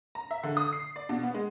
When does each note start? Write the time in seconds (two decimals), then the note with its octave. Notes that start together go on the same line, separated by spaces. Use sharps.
0.15 A#5
0.31 E5
0.43 D3
0.57 D#6
0.73 C7
0.96 D5
1.09 B2
1.23 B3
1.34 G#3